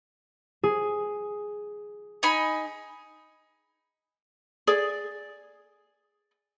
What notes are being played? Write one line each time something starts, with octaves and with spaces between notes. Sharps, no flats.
G#4
D#4 G#5 B5
G#4 D5